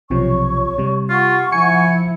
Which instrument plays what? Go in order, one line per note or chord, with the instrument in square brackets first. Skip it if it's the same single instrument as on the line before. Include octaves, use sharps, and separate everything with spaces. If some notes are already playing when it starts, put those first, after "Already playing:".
[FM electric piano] B1 C3 F3 [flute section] C#5 C#6
[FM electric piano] C3 G3
[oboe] F4 [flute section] F#5 C#6
[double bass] F3 E4 [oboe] G#5 [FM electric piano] C#7